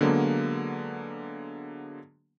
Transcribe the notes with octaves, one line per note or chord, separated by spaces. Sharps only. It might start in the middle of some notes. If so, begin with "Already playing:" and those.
D3 F#3 G#3 A#3 B3